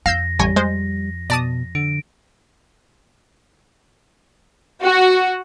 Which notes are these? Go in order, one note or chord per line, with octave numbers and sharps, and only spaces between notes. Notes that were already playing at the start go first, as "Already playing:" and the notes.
F2 F5 E6 G6 A#6
A1 G3 C#5 G#5
G#3 C5
B2 D5 A5 D#6
D3 D7
F#4